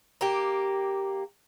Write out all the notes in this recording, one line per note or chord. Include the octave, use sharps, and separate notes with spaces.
A#3 G4